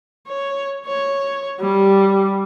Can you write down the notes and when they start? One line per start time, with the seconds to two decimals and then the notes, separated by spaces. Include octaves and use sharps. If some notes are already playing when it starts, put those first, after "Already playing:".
0.27 C#5
0.86 C#5
1.60 G3